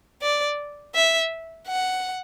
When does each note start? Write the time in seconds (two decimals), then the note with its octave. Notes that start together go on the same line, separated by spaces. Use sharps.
0.22 D5
0.95 E5
1.68 F#5